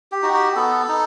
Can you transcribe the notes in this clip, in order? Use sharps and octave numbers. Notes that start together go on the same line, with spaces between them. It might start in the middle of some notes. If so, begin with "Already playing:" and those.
G4
D#4 F#4
G4
B3 A4
D#4